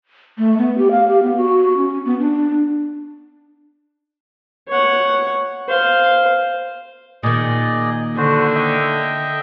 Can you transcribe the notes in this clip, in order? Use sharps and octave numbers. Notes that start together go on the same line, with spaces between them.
A3
B3
G4
F5
G4
B3
F#4
C#4
B3
D4
C#5 F#5
C5 F5
A#2 D#3 G#4 D5 D#5
D3 F#4 C5
D#5 E5 G5